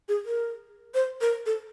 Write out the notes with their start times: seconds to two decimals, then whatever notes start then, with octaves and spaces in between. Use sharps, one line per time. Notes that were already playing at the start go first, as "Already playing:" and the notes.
0.08 G#4
0.26 A#4
0.94 C5
1.21 A#4
1.46 A4